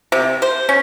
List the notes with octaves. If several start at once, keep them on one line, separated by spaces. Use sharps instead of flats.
C3
C5
C#4